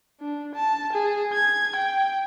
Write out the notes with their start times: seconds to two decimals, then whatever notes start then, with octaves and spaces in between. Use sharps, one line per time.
0.20 D4
0.55 A5
0.93 G#4
1.33 G#6
1.75 G5